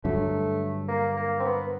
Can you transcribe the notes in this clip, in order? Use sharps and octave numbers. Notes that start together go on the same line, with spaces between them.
G2 D3 F#3 A3
A#3
A#3
C4
B3